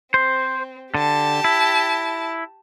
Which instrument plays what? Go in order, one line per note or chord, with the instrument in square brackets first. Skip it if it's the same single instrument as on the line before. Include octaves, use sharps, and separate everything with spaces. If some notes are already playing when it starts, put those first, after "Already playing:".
[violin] C4 [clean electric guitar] C5
[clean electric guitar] D3 [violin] G4 A5
[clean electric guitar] E4